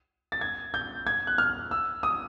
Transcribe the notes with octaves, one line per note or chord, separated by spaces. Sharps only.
A6
G#6
G6
G#6
F#6
F6
E6
D#6